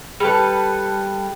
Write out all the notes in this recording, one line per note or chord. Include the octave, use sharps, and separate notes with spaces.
G3 A4 B4